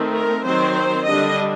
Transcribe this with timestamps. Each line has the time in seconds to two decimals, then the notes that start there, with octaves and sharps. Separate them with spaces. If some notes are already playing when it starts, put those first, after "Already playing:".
Already playing: D#3 A3 C4
0.13 A#4
0.44 D#3 F#3 C4 C5
1.05 D3 G3 D4 D#5